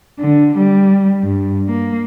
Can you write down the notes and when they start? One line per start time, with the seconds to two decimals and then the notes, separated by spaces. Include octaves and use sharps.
0.20 D3
0.58 G3
1.23 G2
1.69 A#3